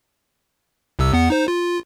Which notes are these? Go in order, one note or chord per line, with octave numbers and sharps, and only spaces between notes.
C2 C3 E6
E2 B3 F#5
D#4 C5
F4